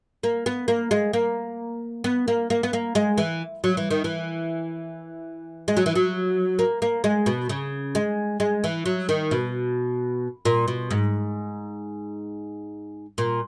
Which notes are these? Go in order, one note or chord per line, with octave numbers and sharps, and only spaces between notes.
A#3
B3
A#3
G#3
A#3
B3
A#3
A#3
B3
A#3
G#3
E3
F#3
E3
D#3
E3
G#3
F#3
E3
F#3
A#3
A#3
G#3
B2
C#3
G#3
G#3
E3
F#3
D#3
B2
A#2
B2
G#2
A#2